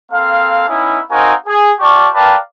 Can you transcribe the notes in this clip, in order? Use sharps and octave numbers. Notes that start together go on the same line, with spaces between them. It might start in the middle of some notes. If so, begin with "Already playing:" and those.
A#3 C4 A4 F5
B3 C#4 D#4 E4
C4 D#4 F#4 A#4 F5 G#5
G#4
F4 G4 D5 A5 C#6
A#4 B4 D5 F5 G5 A5